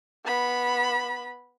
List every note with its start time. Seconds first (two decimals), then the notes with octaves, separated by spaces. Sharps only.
0.25 B3 B5